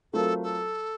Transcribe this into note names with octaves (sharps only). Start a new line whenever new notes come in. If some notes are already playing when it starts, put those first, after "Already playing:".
F#3 A3 C4 F4 A4 A#4
A4